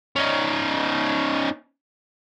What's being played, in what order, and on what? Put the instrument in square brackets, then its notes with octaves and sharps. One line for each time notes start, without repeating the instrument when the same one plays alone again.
[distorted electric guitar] C#4 D#4